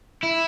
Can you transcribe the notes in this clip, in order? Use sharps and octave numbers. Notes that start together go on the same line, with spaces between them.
E4